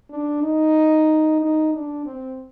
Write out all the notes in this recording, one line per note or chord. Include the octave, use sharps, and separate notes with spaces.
D4
D#4
D#4
D4
C4